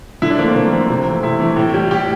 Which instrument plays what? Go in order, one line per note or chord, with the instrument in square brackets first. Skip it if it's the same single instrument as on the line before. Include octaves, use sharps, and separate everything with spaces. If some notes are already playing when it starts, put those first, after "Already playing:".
[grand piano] D3 E4
D4
F3 A#3
A3
C4
D3 A#3
F3 A3 C4
C3
E3 A3
C3 E4
E3 A3
A2
G3
A2 G4